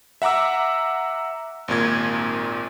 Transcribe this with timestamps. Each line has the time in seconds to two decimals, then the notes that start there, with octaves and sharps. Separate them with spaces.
0.22 E5 F#5 A#5 D6 E6
1.68 G#1 D#2 A#2 G#6